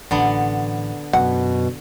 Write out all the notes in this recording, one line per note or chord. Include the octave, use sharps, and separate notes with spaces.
A1 D3 B3
F#2 B2 F#5